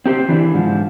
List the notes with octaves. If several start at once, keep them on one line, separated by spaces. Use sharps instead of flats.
C4 G4 A#4 C5
E3 D4
G#2 F3